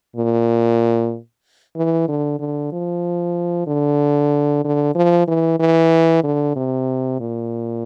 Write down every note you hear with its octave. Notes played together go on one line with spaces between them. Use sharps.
A#2
E3
D3
D3
F3
D3
D3
F3
E3
E3
D3
C3
A#2